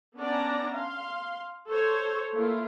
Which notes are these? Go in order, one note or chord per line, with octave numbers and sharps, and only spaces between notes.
B3 C#4 D4 D5 A5 A#5
F5 C6
A4 C5 C#5
A3 A#3 E4 F4